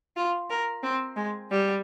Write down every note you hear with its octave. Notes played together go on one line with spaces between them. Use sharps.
F4
A#4
C4
G#3
G3